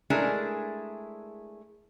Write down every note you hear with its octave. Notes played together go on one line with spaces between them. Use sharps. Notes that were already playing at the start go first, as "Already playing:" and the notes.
G#3 A3 D4 E4 G#4 A#4